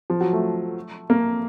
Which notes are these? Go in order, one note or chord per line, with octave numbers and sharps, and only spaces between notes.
F3
F#3
A3
A#3